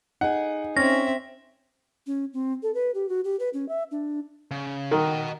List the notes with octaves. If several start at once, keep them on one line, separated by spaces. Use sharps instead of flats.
D#4 G#4 F#5
C4 C#4 E5 A#6
C#4
C4
A4
B4
G4
F#4
G4
B4
C#4
E5
D4
C#3
D#3 F#4 A#4 D#5